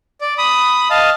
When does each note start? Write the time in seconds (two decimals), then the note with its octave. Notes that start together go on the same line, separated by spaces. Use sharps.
0.21 D5
0.38 B5 D#6
0.90 D#5 F5 A5